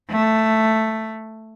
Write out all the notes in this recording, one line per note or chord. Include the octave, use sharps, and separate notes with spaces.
A3